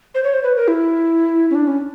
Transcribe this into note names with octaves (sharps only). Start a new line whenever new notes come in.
C5
C#5
C5
B4
A#4
E4
C#4
D4
C#4